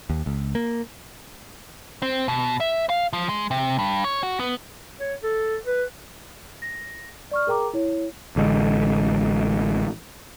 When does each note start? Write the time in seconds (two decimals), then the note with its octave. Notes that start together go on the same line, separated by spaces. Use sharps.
0.10 D#2
0.26 C#2
0.55 A#3
2.02 C4
2.28 B2
2.60 E5
2.90 F5
3.13 F3
3.29 G#3
3.51 C3
3.79 G2
4.04 C#5
4.23 F#4
4.40 B3
5.00 C#5
5.23 A4
5.66 B4
6.62 A#6
7.31 D5 C#6 F6
7.47 G#4 A#4 G5 A#5 D6
7.74 E4 C#5
8.36 A1 D3 G#3